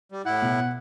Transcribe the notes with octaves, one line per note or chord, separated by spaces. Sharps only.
G3
A2 E4 F#5
B2